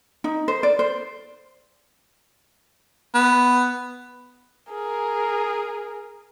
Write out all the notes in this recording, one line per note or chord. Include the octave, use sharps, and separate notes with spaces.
D#4
C5
D5
C5
B3
G#4 A#4